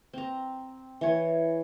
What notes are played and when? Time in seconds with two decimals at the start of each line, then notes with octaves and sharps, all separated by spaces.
0.13 C4 A#5
1.01 E3 C#5